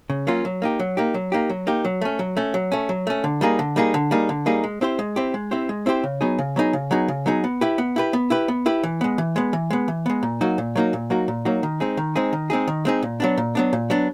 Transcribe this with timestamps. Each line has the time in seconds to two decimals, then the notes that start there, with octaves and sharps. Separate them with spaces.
0.10 C#3
0.27 F#3 A#3 C#4 F4
0.45 F#3
0.62 A#3 D#4 G4
0.79 F#3
0.97 A#3 D#4 G4
1.14 F#3
1.32 A#3 D#4 G4
1.50 F#3
1.67 A#3 D#4 G4
1.85 F#3
2.01 A3 C#4
2.19 F#3
2.37 A3 C#4
2.54 F#3
2.72 A3 C#4
2.89 F#3
3.07 A3 C#4
3.24 D3
3.41 G3 A#3 D#4 G#4
3.59 D3
3.76 G3 A#3 D#4 G#4
3.94 D3
4.11 G3 A#3 D#4 G#4
4.29 D3
4.46 G3 A#3 D#4 G#4
4.64 G#3
4.81 C4 E4 G4 C5
4.99 G#3
5.16 C4 E4 G4 C5
5.34 G#3
5.51 C4 E4 G4 C5
5.69 G#3
5.86 C4 E4 G4 C5
6.04 C#3
6.21 F#3 B3 D#4 G#4
6.39 C#3
6.56 F#3 B3 D#4 G#4
6.73 C#3
6.91 F#3 B3 D#4 G#4
7.08 C#3
7.26 F#3 B3 D#4 G#4
7.44 B3
7.61 E4 G4 B4
7.78 B3
7.96 E4 G4 B4
8.13 B3
8.30 E4 G4 B4
8.48 B3
8.66 E4 G4 B4
8.83 E3
9.01 G#3 B3
9.18 E3
9.36 G#3 B3
9.53 E3
9.70 G#3 B3
9.88 E3
10.06 G#3 B3
10.23 A#2
10.41 F#3 A#3 D#4 F#4
10.58 A#2
10.76 F#3 A#3 D#4 F#4
10.93 A#2
11.10 F#3 A#3 D#4 F#4
11.28 A#2
11.45 F#3 A#3 D#4 F#4
11.63 D#3
11.80 G#3 C4 D#4 G#4
11.97 D#3
12.15 G#3 C4 D#4 G#4
12.33 D#3
12.50 G#3 C4 D#4 G#4
12.68 D#3
12.85 G#3 C4 D#4 G#4
13.03 A#2
13.20 F#3 B3 D4
13.37 A#2
13.55 F#3 B3 D4
13.73 A#2
13.90 F#3 B3 D4